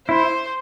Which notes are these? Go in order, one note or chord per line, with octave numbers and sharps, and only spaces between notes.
E4 C5